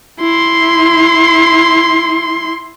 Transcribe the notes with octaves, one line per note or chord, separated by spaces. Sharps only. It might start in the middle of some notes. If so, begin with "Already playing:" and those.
E4 C6